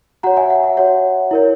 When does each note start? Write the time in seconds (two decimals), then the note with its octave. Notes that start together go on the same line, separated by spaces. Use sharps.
0.23 F#4 F#5 A#5
0.27 C#5
0.37 E5 G#5
0.50 F#5
0.64 E5
0.77 F#4 C#5 F#5
1.31 E4 A#4 C#5